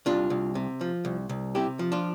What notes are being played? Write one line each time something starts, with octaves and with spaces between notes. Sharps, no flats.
C2 D4 F4
C2
C3
F3
C2
C2
C3 E4 G4
F3
D4 F4